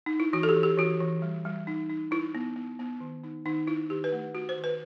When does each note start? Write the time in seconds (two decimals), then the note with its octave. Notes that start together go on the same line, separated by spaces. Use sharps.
0.06 D#4
0.20 E4
0.33 E3 F#4
0.43 A4
0.49 G4
0.56 E3
0.63 G4
0.78 E3 F#4
1.01 E3
1.22 G3
1.45 G3
1.67 D#4
1.90 D#4
2.11 D#4 E4
2.35 B3
2.56 B3
2.79 B3
3.01 D#3
3.24 D#4
3.45 D#3 D#4
3.67 D#4 E4
3.90 D#3 G4
4.04 B4
4.12 A3
4.34 A3 F#4
4.49 C5
4.57 D#3
4.64 B4